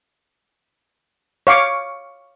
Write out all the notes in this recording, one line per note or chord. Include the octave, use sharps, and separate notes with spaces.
C#5 F5 C#6 D6